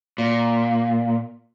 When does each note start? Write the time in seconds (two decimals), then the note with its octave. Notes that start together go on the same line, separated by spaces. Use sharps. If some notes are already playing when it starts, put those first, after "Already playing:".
0.18 A#2